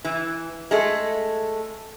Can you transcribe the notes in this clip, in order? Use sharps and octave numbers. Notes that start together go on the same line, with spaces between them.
E3
G#3 A3